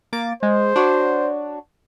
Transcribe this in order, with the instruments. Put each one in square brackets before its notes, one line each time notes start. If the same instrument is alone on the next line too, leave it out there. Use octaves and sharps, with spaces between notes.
[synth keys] A#3 D6 A6
[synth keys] G#3 [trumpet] C5
[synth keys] D4 F#4 C#5